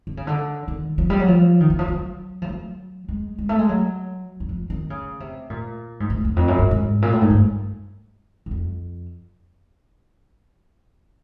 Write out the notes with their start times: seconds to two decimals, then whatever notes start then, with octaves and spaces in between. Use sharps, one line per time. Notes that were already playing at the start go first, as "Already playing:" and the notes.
0.07 D3
0.17 C#3
0.27 D3
0.68 D#3
0.98 F3
1.10 G3
1.20 F#3
1.28 F3
1.60 D#3
1.70 E3
1.79 F3
1.88 F#3
2.42 F3
2.49 F#3
3.09 G#3
3.38 G#3
3.49 A3
3.59 G#3
3.69 F#3
4.40 F#3
4.49 F3
4.70 D#3
4.90 C#3
5.20 C3
5.50 A#2
6.00 G#2
6.10 A2
6.25 E2
6.36 F2
6.48 F#2
6.59 G2
6.71 G#2
7.02 A#2
7.12 A2
7.21 G#2
7.30 G2
8.46 F#2
8.51 F2